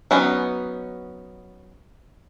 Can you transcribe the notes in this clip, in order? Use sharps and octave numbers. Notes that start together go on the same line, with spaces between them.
F#3 B3 C#4 D#4